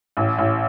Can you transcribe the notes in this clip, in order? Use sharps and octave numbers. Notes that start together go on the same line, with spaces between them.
A1
A1